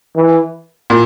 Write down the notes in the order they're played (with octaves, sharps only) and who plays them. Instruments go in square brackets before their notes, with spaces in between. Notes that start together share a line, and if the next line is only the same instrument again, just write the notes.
[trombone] E3
[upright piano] A#2